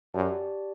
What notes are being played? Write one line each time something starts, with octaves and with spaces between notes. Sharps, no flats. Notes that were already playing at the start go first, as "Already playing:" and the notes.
F#2 G4 D5 A5